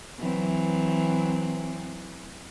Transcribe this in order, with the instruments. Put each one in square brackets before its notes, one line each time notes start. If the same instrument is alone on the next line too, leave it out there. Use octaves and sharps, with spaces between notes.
[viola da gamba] E3 F#3 C4